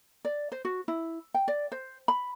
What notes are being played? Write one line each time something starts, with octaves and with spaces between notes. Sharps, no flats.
D5
C5
F#4
E4
G5
D5
C5
B5